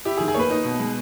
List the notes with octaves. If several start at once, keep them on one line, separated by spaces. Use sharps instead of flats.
E4 G4
G#4
D#3
G#4
A#3 B4 C#5
D#4
B2
G#3